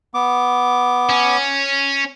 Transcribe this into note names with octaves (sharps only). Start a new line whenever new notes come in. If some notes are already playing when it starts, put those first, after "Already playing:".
B3 D6
C#4